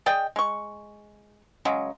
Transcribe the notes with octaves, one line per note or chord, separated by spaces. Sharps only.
G#4 D5 D#5 G5
G#3 C#6
C#3 F#3 G#3